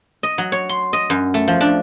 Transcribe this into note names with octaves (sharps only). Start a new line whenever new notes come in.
D#5
F#3
C#5
C6
D#5
F#2
A3
F3
D4